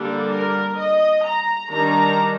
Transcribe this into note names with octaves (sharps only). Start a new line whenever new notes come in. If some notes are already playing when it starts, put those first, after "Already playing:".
Already playing: D3 G3 A#3 D4 A4
A#4
D#5
A#5
D#3 G3 D4 A#5